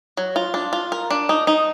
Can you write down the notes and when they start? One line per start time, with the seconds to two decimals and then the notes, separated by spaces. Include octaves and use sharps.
0.17 F#3
0.36 F4
0.54 D4
0.73 F4
0.92 A#4
1.11 D4
1.29 D#4
1.47 D#4